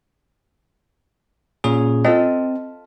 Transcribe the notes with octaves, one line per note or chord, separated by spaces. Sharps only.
A#2 C#4 G#4
C4 F4 A4 D#5